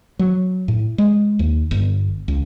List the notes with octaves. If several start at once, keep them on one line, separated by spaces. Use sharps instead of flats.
F#3
A2
G#3
D#2
G1
C#2